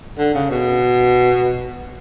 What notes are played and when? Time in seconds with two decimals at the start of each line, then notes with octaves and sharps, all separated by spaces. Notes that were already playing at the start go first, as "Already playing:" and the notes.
0.18 D3
0.34 C#3
0.50 B2